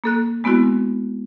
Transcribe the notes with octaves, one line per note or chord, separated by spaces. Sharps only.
A#3 A4 F#6
G#3 B3 C4 E4 F#4